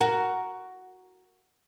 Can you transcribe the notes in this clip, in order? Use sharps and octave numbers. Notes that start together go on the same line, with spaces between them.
F#4 A#4